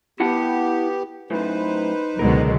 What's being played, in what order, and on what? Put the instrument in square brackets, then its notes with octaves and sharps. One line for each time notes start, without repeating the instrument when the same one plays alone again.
[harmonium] B3 G4 [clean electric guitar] E4 F#5 A5
[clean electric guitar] F#2 A2 E3 [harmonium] D#4 B4 C5
[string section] C#2 B2 [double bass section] D3 F#3 G#3 [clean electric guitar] A#4